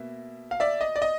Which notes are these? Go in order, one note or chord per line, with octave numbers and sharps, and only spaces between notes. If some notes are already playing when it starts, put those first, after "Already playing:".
Already playing: B2 A#3 E5
F5
D5 E5
D#5
D5
D#5